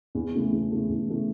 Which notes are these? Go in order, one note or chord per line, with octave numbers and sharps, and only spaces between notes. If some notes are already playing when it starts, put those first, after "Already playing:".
E2
C#3 E3 A3
E2
C#3 E3 A3
E2
C#3 E3 A3